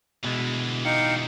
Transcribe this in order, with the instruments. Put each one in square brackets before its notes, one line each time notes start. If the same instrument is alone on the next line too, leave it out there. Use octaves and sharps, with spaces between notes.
[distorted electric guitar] D2 E3 [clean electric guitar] B2 G#3
[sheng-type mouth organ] D#4 F5 G5 [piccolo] C#7